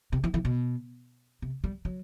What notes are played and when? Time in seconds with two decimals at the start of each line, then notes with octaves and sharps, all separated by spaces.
0.13 C3
0.24 E3
0.34 E3
0.45 B2
1.42 C3
1.64 G3
1.85 F#3